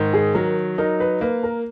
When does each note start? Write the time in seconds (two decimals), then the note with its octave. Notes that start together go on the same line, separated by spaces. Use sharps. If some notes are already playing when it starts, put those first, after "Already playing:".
Already playing: G#2 D#3
0.13 G#4
0.34 F#3 A#4
0.78 D#4 A#4
1.00 B4
1.21 A#3 B4
1.43 A#4